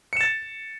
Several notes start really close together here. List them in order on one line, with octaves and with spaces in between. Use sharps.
C#7 E7 A6